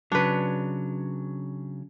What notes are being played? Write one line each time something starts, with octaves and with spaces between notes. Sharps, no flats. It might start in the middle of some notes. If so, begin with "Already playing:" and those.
C#3 F#3 D4 B4